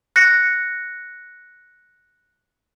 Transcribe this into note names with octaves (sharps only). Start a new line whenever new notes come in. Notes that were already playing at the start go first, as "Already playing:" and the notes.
F#6 A#6 C#7